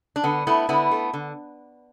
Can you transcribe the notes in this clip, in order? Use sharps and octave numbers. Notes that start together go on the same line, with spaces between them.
D4
D3 B3
A3 B3 E4
D3 B3 E4
A3
D3